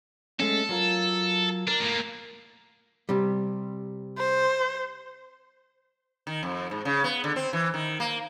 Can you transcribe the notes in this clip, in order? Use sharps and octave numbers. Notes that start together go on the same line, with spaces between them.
G#3 A3 C#4 A4
F#3 F4 A#4
D4 A#4
A2 A#3
C3 G3
C5
D#3
F2
G#2
C#3
B3
D3
C4
E3
D#3
A#3